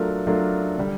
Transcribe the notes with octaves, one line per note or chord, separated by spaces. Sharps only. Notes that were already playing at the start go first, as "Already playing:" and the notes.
Already playing: F#3 A3 D4 F4 A#4
F#3 A3 D4 F4 A#4
D3 G3